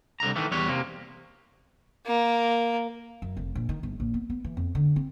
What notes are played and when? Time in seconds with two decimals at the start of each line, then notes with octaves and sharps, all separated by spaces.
0.20 C2 D3 A#5
0.36 D#3 E3 A3
0.52 E2 G3 B4 C#5
0.69 C3 A#3
2.06 A#3
3.22 F#2
3.37 F1
3.55 A#1
3.69 D#3
3.83 G1
4.00 A#1
4.14 B3
4.30 B3
4.44 E3
4.57 F2
4.75 D3
4.96 C4